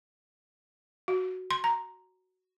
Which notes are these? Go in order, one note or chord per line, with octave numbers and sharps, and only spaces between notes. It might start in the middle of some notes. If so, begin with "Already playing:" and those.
F#4
C6
A#5